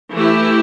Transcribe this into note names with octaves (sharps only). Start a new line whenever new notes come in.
E3 A3 E4 G4